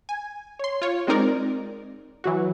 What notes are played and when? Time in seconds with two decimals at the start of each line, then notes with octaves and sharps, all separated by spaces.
0.09 G#5
0.59 C#5 C6
0.82 F4 C#5
1.07 G#3 C4 D#4 A#4 D5
2.24 E3 F#3 F#4